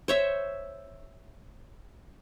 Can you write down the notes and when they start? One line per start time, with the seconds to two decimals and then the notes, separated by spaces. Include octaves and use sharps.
0.08 C5 C#5 E5